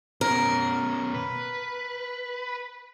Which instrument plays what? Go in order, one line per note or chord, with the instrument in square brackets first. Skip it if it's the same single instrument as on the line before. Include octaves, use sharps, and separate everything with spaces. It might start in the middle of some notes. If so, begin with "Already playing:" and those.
[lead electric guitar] B2 C#4 [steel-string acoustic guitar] A#4
[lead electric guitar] B4